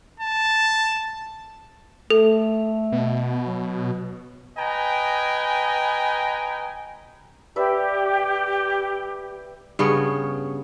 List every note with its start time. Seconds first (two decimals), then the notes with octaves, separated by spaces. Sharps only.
0.20 A5
2.10 A3 A4
2.92 B2
3.46 F#3
4.58 B4 D#5 G5 G#5 A#5
7.56 G4 B4 D5 E5
9.79 G2 C#3 B3 C#5